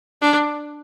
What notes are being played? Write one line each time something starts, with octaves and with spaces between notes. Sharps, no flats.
D4